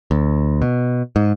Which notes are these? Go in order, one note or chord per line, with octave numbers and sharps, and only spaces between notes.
D2
B2
G#2